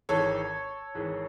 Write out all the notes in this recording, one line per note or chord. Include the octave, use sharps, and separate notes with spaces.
G#1 G#2 E3 A4 C#5
G#1 G#2 E3